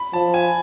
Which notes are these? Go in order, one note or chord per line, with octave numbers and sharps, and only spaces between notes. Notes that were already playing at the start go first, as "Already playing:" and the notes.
Already playing: B5
F3 A5
G#5